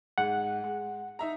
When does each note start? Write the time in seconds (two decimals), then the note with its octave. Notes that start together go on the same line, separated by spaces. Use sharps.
0.18 G#2 F#5
0.64 G#3
1.19 D#4 E5 A#5